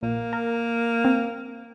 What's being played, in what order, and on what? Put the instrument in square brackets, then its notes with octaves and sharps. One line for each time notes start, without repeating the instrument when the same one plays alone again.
[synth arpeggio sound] A#1 [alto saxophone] A#3
[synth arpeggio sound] A#4
C4